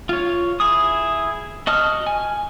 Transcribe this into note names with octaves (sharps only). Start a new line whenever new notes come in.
F4 C#5
E4 G#4 D#6
F#4 D#5 A5 D#6 F6
G#5